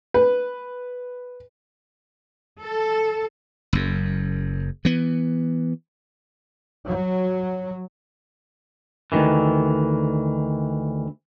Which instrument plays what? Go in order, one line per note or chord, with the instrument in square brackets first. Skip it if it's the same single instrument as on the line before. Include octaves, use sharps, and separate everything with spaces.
[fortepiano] B4
[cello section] A4
[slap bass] F#1 F#2
E3 B3
[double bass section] F#3
[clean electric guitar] D2 G#2 D#3 E3